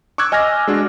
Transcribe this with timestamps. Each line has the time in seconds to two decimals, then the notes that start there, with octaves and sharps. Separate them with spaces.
0.18 C#6 D6 E6 F#6 G#6
0.32 D#5 G#5 F6 G#6 A#6
0.68 G#3 D4 F#4